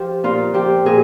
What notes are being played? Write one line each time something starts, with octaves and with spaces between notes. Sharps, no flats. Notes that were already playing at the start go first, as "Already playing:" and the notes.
Already playing: F3 G4
A#2 F4
F3 G4
A#2 G#4